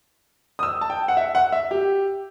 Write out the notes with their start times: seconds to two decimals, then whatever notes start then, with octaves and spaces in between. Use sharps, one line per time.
0.59 D#6
0.63 E6
0.81 A5
0.90 G5
1.08 F#5
1.17 E5
1.35 F#5
1.52 E5
1.71 G4